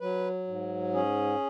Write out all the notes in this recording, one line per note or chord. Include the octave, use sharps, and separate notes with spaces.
F#3 B4
G#2
C#4 G#4